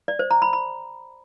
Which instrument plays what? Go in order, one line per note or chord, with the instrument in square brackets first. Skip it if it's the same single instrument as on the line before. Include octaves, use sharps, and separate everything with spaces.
[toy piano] D5
C5
A#5
B5
B5